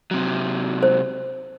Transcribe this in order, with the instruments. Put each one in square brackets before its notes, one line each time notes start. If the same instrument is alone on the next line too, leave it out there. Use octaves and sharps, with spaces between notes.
[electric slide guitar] C3 F#3
[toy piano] C5